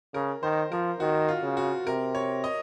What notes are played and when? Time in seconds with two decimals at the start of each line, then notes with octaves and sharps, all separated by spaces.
0.14 C#3 A#4
0.43 D#3 C5
0.72 F3 A#4
1.00 D#3 F#4
1.28 F4
1.43 C#3
1.57 F#4
1.87 C3 A#4
2.15 C#5
2.44 D#5